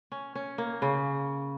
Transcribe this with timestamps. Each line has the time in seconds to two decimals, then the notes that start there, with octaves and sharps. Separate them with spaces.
0.12 C#4
0.35 C#4
0.58 A#3
0.82 C#3